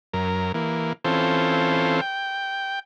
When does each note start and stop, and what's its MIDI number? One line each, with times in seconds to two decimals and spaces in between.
0.13 0.52 42
0.13 0.52 70
0.54 0.93 52
0.54 0.93 58
1.05 2.01 52
1.05 2.01 60
1.05 2.01 61
1.05 2.01 65
1.05 2.01 69
1.05 2.01 72
2.01 2.79 79